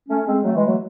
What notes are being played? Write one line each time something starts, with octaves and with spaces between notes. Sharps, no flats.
A3 C#4
G#3 C4
F#3 A3
E3 G#3
F#3 A3